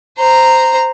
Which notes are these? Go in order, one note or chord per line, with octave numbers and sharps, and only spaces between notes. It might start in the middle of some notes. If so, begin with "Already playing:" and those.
C5 A#5